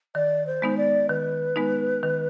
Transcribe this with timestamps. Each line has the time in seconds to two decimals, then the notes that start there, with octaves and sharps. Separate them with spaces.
0.15 D#3 D5
0.47 C5
0.62 G#3 B3 D#4
0.77 D5
1.09 D#3 B4
1.56 G#3 B3 D#4
2.03 D#3